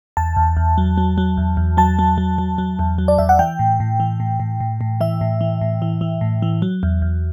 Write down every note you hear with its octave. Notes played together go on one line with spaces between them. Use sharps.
E2 A5
E2
E2
F#3
F#3
F#3
E2
E2
F#3 A5
F#3
F#3
F#3
F#3
E2
F#3
D5
E2 E5
F#5
E3 G5
A2
A2
E3
A2
A2
A2
A2
E3 E5
A2
E3
A2
E3
E3
A2
E3
F#3
E2
E2